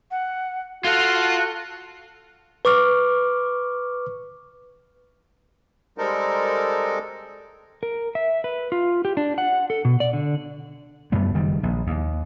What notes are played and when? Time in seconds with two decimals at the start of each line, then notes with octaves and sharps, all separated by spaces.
0.11 F#5
0.84 F4 F#4 A4 F5
2.65 B4 C#6 D6 F6
5.98 G3 G#3 C4 D#4 A4 A#4
7.83 A#4
8.15 E5
8.44 B4
8.72 F4
9.05 G4
9.17 D4
9.38 F#5
9.70 A4
9.85 B2
10.00 D5
10.13 D3
11.12 F#2 G3 A3 B3
11.35 F#1 D#3 G3
11.63 A#1
11.87 D#2